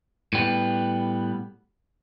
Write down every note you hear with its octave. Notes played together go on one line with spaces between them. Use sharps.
A2 G3 B3